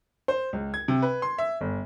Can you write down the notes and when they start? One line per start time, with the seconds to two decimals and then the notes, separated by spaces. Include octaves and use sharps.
0.28 C5
0.53 C#2
0.74 G#6
0.88 C3
1.02 B4
1.22 C6
1.38 E5
1.61 G1